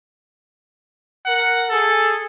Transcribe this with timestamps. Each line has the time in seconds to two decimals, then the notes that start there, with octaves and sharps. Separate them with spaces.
1.26 A#4 F#5
1.70 G#4 A4